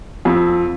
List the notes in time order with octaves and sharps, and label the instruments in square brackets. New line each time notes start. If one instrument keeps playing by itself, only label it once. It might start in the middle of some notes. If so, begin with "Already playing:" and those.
[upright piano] F2